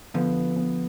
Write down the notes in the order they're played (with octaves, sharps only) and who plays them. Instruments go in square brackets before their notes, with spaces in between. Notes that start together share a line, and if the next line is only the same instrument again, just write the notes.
[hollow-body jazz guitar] D3 F3 [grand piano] B3
[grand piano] B3